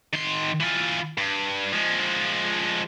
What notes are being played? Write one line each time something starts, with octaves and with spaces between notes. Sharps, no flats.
D#3 C6
E3 F4
G2
F3 G#3